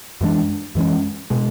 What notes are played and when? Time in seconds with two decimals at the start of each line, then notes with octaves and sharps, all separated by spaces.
0.21 F#2 E3 G#3 D4
0.75 F#2 E3 G#3 C#4
1.30 B2 G#3